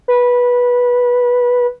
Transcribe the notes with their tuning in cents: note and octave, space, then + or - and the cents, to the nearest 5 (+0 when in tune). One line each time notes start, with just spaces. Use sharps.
B4 -15